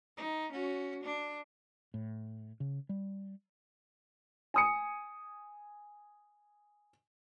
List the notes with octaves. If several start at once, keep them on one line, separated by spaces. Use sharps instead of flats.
D#4
C#4 F#4
D4
A2
C#3
G3
G#5 D#6 C#7